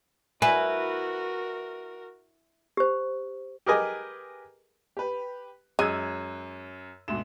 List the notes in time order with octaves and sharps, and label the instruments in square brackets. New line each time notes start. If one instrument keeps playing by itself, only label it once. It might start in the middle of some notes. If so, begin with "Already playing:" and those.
[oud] E4 [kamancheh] F#4 A#4 [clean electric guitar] B4 [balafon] G#5
[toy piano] G4 C5
[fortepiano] G4 G#4 A#4 B4 D#5 G#5
[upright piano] G4 B4
[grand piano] F#2 E6 D#7 [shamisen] G#3 [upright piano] F#6 G#6
[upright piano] D2 G#2 B2 [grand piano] E7